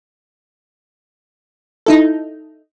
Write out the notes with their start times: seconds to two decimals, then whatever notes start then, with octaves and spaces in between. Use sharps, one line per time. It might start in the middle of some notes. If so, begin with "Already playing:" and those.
1.86 D#4 E4 A4